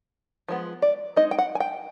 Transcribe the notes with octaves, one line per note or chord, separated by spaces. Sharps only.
F3 G#3 B3
D5
G#3 C4 D#4 D#5
G5
F#5
G#5
G5